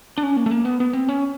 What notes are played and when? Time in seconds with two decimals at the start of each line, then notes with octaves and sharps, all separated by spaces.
0.18 D4
0.23 C#4
0.37 A#3
0.46 A3
0.51 A#3
0.65 B3
0.80 B3
0.93 C4
1.09 C#4